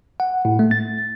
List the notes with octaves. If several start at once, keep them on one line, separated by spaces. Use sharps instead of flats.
F#5
A2
A3
A6